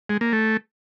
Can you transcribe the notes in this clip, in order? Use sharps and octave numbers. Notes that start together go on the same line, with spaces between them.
G#3
A#3
A3